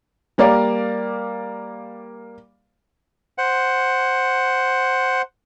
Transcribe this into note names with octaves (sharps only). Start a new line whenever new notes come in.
G3 A#3 A#4 D5 F5
C5 F#5